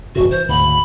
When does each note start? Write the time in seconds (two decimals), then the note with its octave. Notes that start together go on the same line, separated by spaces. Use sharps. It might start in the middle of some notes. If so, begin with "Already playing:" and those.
0.15 F1 G#2 C3 F#4
0.31 E3 C5
0.49 D2 G#2 C#3 B5